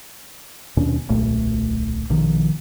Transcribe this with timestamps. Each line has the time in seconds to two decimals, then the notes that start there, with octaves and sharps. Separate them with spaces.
0.77 D#2 B2 C#4 D4
1.09 D1 B1 A#2 A3
2.10 A#1 B2 D#3 F3